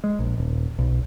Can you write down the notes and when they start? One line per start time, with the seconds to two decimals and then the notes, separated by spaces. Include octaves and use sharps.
0.04 G#3
0.19 A#1
0.38 D#1
0.79 B1